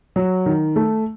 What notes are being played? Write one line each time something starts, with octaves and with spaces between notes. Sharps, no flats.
F#3
D#3
A3